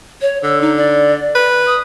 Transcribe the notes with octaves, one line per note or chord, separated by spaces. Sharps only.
C#5
D3 E6
D#4
D5
B4
D#6